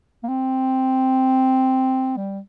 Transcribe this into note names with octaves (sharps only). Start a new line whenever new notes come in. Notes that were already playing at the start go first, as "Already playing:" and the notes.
A#3
C4
G3